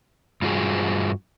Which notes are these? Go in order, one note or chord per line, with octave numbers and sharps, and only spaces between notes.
G2 F4 F#4 G#4